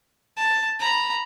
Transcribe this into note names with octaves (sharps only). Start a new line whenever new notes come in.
A5
A#5 B5